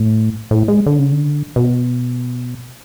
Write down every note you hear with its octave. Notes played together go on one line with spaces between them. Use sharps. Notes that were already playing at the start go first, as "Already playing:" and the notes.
Already playing: A2
A2
G#3
D3
C#3
D3
B2